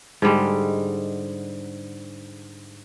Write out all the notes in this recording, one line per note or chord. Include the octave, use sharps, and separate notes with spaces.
G#2 D3 G3 G#3